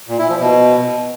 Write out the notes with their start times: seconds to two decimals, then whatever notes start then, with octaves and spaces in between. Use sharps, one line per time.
0.08 A#2
0.19 E4
0.29 F3
0.40 B2